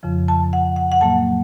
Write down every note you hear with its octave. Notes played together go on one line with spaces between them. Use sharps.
F2 C#3 F3
A5
F#5
F#5
F#5
A2 F#3 A#3 A5